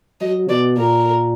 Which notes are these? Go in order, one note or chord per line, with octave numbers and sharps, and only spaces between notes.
F#3 D#5
B2 D5
A#2 A#4